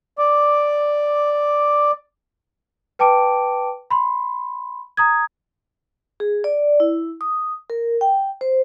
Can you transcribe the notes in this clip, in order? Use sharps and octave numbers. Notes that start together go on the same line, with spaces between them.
D5 D6
B4 G5 A5 D6 D7
B5 C6
A#5 D#6 G#6
G#4
D5
E4
D#6
A#4
G5
C5